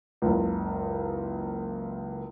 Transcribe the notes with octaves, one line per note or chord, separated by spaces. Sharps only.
F#1 C#2